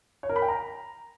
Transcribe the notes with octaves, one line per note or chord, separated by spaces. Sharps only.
C#5
A#4
B5
G5
A#5